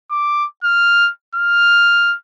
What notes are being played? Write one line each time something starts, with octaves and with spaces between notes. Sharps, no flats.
D6
F6
F6